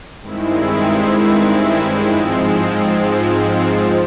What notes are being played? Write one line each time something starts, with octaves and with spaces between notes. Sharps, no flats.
G2 D#3 G#3 C4 E4
G#2 F3 G#3 C4
F3